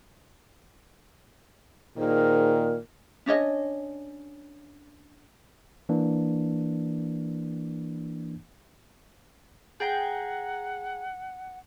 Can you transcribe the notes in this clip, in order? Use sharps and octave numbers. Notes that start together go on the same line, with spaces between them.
A#2 D#3 D#4 G#4 A#4 C5
C#4 D4 C#5 D#5
E3 A#3 D4
G#4 F#5 G5 A#5